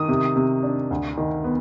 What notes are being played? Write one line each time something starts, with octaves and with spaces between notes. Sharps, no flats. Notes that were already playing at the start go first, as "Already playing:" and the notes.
Already playing: D#3 D#6
C3
C3
D4
D2
D#3
B3